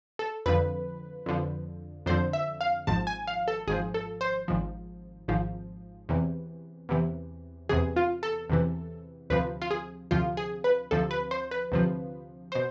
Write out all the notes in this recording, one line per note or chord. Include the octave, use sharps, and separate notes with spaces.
A4
F2 D3 F3 B4
F2 D3 F3
F2 D3 F3 C5
E5
F5
G#1 G#2 F3 A5
G#5
F5
A4
G#1 G#2 F3 G#4
A4
C5
G#1 G#2 F3
G#1 G#2 F3
E2 C3 E3
E2 C3 E3
E2 C3 E3 G#4
F4
A4
E2 C3 E3
D2 C3 F3 B4
F4
G#4
D2 C3 F3 F4
G#4
B4
D2 C3 F3 A4
B4
C5
B4
D2 C3 F3
B2 C5